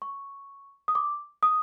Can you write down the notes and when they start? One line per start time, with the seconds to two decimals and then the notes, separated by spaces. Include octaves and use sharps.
0.02 C#6
0.88 D#6
0.95 D6
1.43 D#6